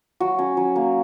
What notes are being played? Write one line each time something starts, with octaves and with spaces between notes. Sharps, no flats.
F#3 F#4
C#4
F#3
A#3